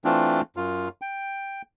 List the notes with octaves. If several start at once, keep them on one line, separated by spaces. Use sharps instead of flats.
E3 A3 C4 D4 F4
F#2 F4
G5